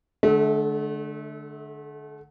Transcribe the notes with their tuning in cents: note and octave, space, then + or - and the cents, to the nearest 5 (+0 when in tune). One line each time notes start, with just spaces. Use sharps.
D3 +10 A3 -35 E5 -40